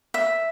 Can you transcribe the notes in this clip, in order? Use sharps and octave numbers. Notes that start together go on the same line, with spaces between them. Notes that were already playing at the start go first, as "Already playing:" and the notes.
E5